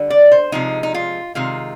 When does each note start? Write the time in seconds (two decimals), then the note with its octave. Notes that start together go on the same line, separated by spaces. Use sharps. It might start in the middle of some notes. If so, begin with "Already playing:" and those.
Already playing: D3 G3
0.10 D5
0.32 C5
0.52 C3 F3 G#3 D#4
0.83 D#4
0.94 F4
1.35 C3 D#3 G#3 F4